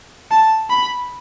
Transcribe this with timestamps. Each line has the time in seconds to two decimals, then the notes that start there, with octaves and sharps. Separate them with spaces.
0.31 A5
0.70 B5